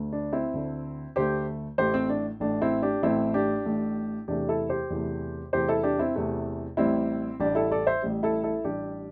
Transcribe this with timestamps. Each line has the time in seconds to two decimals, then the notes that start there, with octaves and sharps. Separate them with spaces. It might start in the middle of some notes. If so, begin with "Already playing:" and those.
Already playing: D2 D3 A3
0.13 D4
0.32 C4 E4
0.53 D2 D3 A3
1.16 D2 D3 A3 G4 C5
1.78 A1 A2 A3 G4 C5
1.94 C4
2.09 D4
2.40 A1 A2 A3 D4
2.62 C4 E4
2.82 D4 G4
3.03 A1 A2 A3 C4 E4
3.34 D4 G4
3.65 A1 A2 A3
4.28 E2 C3 E3 A3 D4 G4
4.49 E4 A4
4.70 G4 C5
4.90 E2 C3 E3 A3
5.53 E2 C3 E3 A3 G4 C5
5.68 E4 A4
5.83 D4 G4
5.99 C4 E4
6.15 E2 C3 E3 A3
6.77 A1 A2 G3 C4 E4
7.40 A1 A2 G3 D4 G4
7.55 E4 A4
7.71 A4 D5
7.87 C5 E5
8.02 A1 A2 G3
8.23 E4 A4
8.44 E4 A4
8.64 A1 A2 G3 D4 G4